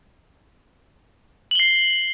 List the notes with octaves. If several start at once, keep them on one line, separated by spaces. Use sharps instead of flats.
C7 F#7 G7